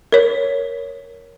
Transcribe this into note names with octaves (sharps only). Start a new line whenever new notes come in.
A#4 C#5